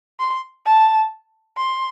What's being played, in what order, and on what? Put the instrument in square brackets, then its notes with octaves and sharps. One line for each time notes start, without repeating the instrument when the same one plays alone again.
[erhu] C6
A5
C6